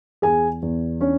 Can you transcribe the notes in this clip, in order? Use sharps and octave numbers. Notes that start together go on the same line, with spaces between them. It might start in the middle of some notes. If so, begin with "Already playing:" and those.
E2 G#4 G#5
E2
C#4 D4 C#5